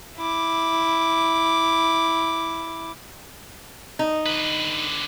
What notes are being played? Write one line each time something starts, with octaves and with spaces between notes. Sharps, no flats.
E4 D6
D#4
D3 B4